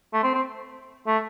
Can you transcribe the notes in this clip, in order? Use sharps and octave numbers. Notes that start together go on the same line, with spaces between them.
A3
C4
C4
A3